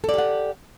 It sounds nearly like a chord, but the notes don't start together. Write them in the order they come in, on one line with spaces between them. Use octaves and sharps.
A4 D5 G4 F#5